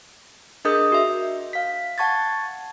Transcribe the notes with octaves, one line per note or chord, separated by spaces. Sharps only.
D4 G#4 A#4 D#5 D#6 G6
F#4 E5
F5 B6
F#5 A5 C#6 G#6 A6